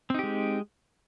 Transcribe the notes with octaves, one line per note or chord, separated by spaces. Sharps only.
G#3 C4 D#4 G4